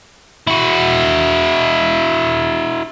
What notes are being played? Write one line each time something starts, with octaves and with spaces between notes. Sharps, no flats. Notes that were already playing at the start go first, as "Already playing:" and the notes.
E4 F#4